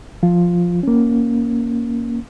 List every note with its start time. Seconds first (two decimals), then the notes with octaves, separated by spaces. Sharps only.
0.23 F3 F4
0.83 A#3 C#4